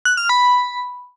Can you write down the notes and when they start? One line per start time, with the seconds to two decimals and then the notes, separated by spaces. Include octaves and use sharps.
0.05 F#6
0.17 F6
0.29 B5